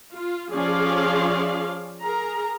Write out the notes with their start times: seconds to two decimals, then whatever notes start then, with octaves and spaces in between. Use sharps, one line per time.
0.13 F4
0.52 F3 C#4 G#4 D5 F5 C6
2.03 G#4 A#4 A#5